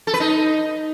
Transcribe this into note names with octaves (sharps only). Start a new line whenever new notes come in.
A4
B4
D#4